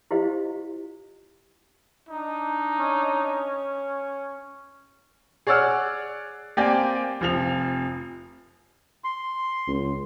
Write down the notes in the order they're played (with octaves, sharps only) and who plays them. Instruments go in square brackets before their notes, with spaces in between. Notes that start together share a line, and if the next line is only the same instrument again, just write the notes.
[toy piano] E4 F4 G4 C5 D#5 F5
[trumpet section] D4 D#4
[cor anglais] C#4
[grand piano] G#4 C#5 D5 F#5 E6 F6
A#3 C4 G4 D5 G5 G#5
F1 F3 F7
[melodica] C6
[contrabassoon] C#2